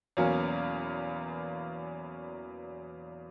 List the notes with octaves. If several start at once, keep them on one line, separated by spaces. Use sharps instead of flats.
E2 B2 F#3 A#3 C#4